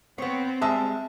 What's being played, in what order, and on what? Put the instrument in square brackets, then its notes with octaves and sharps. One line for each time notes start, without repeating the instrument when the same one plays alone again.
[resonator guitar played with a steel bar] B3 C#5 [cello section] C4
[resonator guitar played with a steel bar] G3 G#3 E5 [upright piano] A5